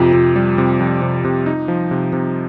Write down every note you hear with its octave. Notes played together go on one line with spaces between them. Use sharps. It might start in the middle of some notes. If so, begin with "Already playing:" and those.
Already playing: F2 C3 F4
C3
G3
C3
F2
C3
C3
D#4
F3
C3
C3